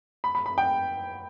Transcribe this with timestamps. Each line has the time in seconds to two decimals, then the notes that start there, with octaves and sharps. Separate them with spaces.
0.24 B5
0.35 B5
0.46 B5
0.58 G5